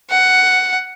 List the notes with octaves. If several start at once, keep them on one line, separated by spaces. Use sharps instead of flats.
F#5